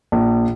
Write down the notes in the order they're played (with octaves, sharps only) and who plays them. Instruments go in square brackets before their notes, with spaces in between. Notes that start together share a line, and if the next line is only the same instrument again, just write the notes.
[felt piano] A#1